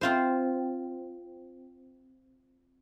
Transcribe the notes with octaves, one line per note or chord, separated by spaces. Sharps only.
C4 F4 C5